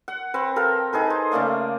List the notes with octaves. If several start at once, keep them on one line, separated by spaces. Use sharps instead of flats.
F#5
C4 B4
A4 A#4 F5 G5
D#4 G#4 A4 B4
C5
C#3 A3 A#3 D5